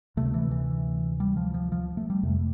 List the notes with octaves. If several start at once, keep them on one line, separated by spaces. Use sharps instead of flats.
D2 C3 A3
E3
E3
G3
F3
F3
F3
A3
G3
F2 C3 A3